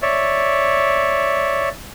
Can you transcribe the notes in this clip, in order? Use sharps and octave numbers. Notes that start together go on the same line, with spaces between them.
C#5 D5 E5